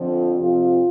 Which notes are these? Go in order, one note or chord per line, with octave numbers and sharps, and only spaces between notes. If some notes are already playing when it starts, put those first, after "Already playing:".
Already playing: F2 D3 F3
F2 C3 F3 F4